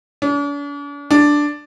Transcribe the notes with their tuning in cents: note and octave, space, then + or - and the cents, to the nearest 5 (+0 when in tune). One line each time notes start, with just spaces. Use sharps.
D4 -45
D4 +0